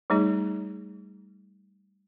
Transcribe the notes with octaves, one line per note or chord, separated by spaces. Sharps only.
G3 A3 D#4 G#4